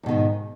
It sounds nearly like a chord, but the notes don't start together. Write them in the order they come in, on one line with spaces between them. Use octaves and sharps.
E2 B2 D#3 G#2